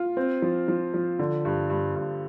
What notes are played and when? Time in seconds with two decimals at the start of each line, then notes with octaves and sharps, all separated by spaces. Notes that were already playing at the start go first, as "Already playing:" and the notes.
Already playing: F4
0.17 C4
0.42 F3
0.68 F3
0.94 F3
1.19 D3
1.45 G2
1.70 G2
1.96 G2